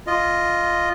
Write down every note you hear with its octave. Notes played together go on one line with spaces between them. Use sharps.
F4 D#5